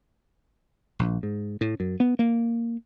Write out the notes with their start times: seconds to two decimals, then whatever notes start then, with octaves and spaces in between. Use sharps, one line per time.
0.99 A#1
1.23 G#2
1.61 A2
1.80 F#2
2.00 B3
2.19 A#3